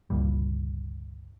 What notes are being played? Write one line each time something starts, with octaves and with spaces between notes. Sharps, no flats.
G1 C#2 A#2 G3